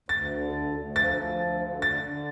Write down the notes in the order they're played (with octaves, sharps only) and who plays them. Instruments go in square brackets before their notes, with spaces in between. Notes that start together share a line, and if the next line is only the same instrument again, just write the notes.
[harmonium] D2 [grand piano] A6
[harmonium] D3
D2
D2
[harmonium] F3 [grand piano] A6
[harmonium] F3
D2
D3
[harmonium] D3 [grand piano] A6
[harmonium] D3